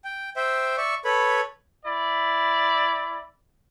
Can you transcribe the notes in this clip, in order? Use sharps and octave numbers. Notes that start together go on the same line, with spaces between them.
G5
C5 E5 G5
D5 E5 C#6
A4 B4 C#5 B5
E4 D5 B5